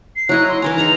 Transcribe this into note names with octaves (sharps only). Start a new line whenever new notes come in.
C7
F#3 E4 D#5 F#6
C6
E3 A#4 G#5 A#5
D#4 G#4 A#5 F7